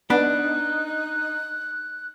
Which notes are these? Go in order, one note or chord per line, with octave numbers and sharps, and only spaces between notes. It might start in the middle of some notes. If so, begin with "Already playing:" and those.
B3 D4 D#4 F#6